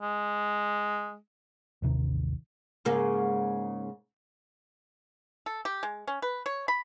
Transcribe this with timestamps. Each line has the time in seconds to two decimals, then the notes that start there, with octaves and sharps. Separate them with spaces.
0.02 G#3
1.82 A1 D#2 C3 D#3
2.85 G#2 C#3 A#3
5.46 A4
5.65 G4
5.83 G#3
6.07 C#4
6.22 B4
6.46 C#5
6.68 B5